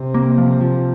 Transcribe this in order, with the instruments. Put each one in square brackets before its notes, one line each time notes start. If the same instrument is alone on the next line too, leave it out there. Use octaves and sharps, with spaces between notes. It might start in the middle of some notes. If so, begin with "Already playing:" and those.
Already playing: [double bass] C3
[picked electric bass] A#3
F3
F3